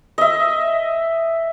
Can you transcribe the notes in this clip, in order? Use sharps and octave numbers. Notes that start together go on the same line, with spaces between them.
D#5 E5